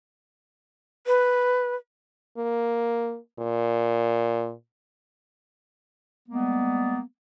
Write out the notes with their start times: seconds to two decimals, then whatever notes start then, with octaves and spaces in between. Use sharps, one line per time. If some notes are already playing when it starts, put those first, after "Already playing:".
1.07 B4
2.37 A#3
3.39 A#2
6.29 G3 G#3 A#3 B3